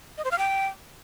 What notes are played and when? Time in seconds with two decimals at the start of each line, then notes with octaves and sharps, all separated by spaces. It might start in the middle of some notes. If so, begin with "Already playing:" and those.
0.18 D#5
0.25 C5
0.31 F5
0.38 G5